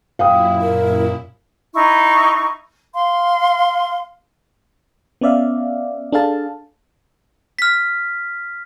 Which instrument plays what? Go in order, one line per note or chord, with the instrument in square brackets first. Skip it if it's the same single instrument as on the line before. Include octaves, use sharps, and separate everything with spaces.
[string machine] F#2 A#2 E4 [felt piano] F5 G5 D#6
[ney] A#4
[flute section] D#4 E4 C#6
F5 C6
[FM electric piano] B3 C#4 D5 E5 F5
D4 G#4 A4 F5 A5
[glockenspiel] F6 B6